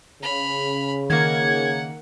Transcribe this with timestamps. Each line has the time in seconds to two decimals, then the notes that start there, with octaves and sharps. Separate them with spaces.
0.22 C#3 B5 F6
1.10 D#3 A#3 F#5 G#6